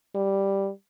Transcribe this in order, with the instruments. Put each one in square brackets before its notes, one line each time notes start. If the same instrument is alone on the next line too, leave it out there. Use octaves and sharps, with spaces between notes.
[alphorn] G3